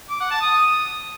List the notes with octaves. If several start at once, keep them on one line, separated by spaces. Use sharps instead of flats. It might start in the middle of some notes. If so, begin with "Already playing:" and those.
D6
F#5
A5
D#6